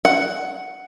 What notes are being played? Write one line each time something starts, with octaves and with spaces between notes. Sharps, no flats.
F#5